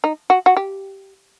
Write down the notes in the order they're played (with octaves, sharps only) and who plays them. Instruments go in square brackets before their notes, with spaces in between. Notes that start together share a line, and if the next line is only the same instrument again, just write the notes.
[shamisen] D#4
F#4
F#4
G4